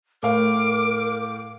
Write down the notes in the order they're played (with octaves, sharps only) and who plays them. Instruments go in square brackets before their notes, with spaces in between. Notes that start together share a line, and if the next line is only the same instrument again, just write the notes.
[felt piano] A2 F5 [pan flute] A#4 [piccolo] D6